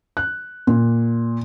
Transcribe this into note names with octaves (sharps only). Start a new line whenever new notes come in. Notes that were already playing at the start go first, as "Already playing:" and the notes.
F#6
A#2